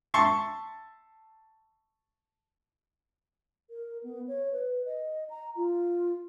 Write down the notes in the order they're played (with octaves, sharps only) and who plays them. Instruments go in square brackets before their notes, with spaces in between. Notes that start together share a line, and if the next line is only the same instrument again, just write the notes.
[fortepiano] E5 A5 C6 C#6
[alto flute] A#4
B3
C#5
B4
D#5
A#5
F4